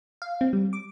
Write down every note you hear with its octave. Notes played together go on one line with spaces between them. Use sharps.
F5
C4
G3
D6